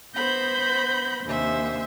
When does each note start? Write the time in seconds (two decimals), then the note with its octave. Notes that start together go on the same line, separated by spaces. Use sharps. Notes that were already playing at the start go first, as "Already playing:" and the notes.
0.14 B3 C5 B5 G6 A#6
1.24 D#2 C3 D4 C5 E5 G#5